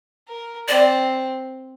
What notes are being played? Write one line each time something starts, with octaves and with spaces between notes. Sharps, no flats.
A#4
C4 D5